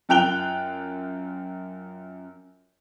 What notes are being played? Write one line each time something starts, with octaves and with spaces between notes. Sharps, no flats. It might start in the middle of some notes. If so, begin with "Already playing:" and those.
F#2 F4 G5 F#6 F7 G7